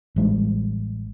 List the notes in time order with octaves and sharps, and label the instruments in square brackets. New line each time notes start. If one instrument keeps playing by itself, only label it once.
[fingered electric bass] A1 G3 G#3